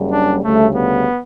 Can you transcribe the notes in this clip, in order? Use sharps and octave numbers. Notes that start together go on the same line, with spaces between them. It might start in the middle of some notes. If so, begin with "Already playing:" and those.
Already playing: F#1 F#2 C#3 G3
D4
D2 C#3 G3 A3
B3